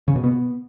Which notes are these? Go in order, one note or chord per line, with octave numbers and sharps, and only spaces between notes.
C#3
B2
B3